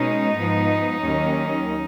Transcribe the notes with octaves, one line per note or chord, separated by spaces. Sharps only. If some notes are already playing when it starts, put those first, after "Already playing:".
Already playing: B2 G#3 C#4 D#4
G#2 F3 B3
D#2 D#3 F#3 C#4